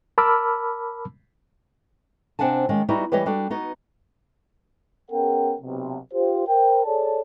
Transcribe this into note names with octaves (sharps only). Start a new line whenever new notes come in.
A#4 A5 B5 D6 E6 F6
C3 C4 D4 F#5 G#5 A5
D#3 G#3 A#3 C#4
G3 B3 D#4 E4 F#4 G4
E3 G3 G4 B4 C#5 D#5
G3 D4 F#4 A4
B3 D#4 F#4
B3 C#4 G#4 A#4 F#5 G5
B1 C3
F4 G4 C5
A#4 C5 G5
G#4 A4 C#5 D5 A5